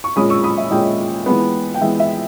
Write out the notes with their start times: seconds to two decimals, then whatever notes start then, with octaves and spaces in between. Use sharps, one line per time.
0.04 C#6
0.16 A#2 G#3 C#4 B5 D#6
0.30 C#6 E6
0.44 B5 D#6
0.58 E5
0.71 A#2 G#3 C#4 D#5 G5
1.26 E3 G#3 B3
1.74 G5
1.81 E3 G#3 B3 E5
2.00 E5